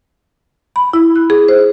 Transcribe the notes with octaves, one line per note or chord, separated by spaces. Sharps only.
B5
E4
F#6
G#4
C5